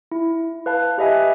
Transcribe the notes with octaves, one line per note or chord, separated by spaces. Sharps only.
E4
B4 F5 A5
G4 B4 D#5 E5 G#5